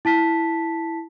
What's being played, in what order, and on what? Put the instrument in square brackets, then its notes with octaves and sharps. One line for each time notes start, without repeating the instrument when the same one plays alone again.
[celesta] E4 A5 B6